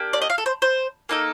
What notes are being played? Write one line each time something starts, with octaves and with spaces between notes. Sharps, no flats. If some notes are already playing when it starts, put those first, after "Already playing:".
Already playing: A#3 D4 G4
D5
D#5
F5
A4
C5
C5
A#3 D#4 A4